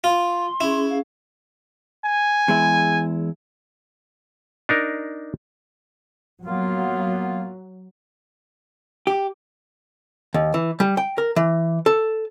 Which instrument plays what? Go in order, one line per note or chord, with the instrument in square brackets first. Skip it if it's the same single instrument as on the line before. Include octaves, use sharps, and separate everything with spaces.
[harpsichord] F4 [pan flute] C6
[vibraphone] C#4 G#4 [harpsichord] E4
[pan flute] F5
[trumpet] G#5
[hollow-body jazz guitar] E2 G#3 E4
[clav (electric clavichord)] D4 D#4 A#4
[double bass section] F#3 [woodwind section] A#3 B3 F4
[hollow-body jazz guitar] G4
D#2
E3
G3
G5
A#4
E3
A4